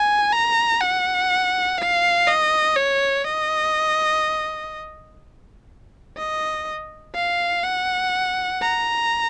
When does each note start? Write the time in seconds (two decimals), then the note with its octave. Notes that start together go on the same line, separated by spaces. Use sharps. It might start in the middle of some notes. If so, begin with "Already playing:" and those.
Already playing: G#5
0.32 A#5
0.81 F#5
1.78 F5
2.27 D#5
2.76 C#5
3.25 D#5
6.17 D#5
7.15 F5
7.64 F#5
8.61 A#5